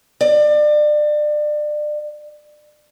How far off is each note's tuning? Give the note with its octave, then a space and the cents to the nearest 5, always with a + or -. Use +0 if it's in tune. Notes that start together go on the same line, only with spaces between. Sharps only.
D5 +30